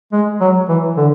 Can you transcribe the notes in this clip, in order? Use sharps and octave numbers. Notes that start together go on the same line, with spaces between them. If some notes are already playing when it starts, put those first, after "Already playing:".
G#3
F#3
E3
D3